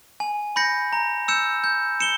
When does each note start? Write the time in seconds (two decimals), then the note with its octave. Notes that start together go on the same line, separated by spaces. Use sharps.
0.20 G#5
0.56 B5 G6 A#6 C#7
0.93 A#5
1.28 E6 G6 C#7 E7
1.64 G6
2.00 C#7 E7 G7